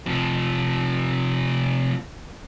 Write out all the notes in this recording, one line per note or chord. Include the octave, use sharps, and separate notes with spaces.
C3 F3